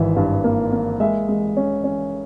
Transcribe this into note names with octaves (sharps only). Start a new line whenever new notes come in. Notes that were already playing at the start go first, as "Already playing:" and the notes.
Already playing: G#1 E3 E5
G2
A#3
A#3
G#3 E5
G#3
C#4
C#4